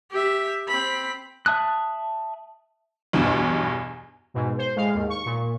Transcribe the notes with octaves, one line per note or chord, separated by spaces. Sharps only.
G4 E5
C4 B5
E5 A5 D#6 F#6
B1 E2 G2 B2
G#2 B2
C5
A2 G#3 F5
D#2 G#2
C#6
A#2